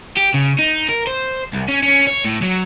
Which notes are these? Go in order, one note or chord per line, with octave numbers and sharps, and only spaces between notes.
G4
C#3
D#4
A#4
C5
C2
C#4
C#4
C#5
A2
F#3